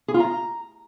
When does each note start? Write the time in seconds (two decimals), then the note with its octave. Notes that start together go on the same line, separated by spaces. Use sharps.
0.08 G#4
0.14 F4
0.20 A#5